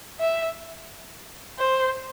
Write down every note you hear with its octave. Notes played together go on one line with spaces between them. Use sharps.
E5
C5